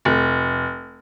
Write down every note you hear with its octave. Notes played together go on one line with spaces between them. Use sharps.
F1